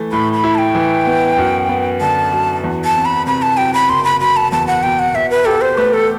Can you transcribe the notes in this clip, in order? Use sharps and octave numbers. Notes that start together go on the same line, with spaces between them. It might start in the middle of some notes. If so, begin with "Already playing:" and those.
Already playing: E3 A3
A2 B5
B5
E4
A5
G5
E3
B3
F#2
B3
D3 A5
F#3
E2
A5
C4
B5
C3 B5
A5
F#3 G5
B5
F#1 C6
B5
F#3 B5
A5
E2 A5
F#5
B2 G5
F#5
B2 E5
B4
G4 A4
C5
A3 B4
A4